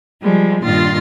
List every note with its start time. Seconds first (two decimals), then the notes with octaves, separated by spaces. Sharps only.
0.22 F3 G3 G#3
0.63 G2 A#2 D#3 F4 C6 A6